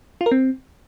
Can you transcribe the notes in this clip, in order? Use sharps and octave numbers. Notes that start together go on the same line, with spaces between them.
F4
A#4
C4